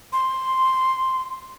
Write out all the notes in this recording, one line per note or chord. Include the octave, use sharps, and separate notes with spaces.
C6